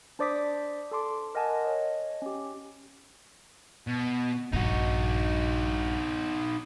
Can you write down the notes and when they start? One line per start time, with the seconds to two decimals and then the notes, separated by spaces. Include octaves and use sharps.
0.19 D4 C5 D5 D6 D#6 B6
0.91 A4 A5 C6 D6
1.35 A#4 D#5 F#5 G#5 A5
1.65 C#5 D#5
2.22 C#4 G4
3.87 B2
4.54 A#1 G2 D#4 F#4